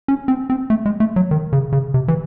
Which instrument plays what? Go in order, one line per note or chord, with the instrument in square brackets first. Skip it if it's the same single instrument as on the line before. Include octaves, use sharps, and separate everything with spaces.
[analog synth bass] C#4
C4
C4
A3
G#3
A3
F#3
D#3
C#3
C#3
C3
E3